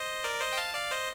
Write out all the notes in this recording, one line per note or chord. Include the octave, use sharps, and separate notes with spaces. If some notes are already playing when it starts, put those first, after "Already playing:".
Already playing: C5 D#5
A#4 D5
C5 D#5
G5
F5 A5
D5 F5
C5 D#5